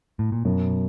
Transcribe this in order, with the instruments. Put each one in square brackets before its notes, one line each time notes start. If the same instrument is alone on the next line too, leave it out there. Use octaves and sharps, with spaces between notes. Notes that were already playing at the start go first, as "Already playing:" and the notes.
[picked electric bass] A2
A#2
[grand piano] F#2 [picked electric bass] B2